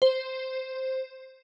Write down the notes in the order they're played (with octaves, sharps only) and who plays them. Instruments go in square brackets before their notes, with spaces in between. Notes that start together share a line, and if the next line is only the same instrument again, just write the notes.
[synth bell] C5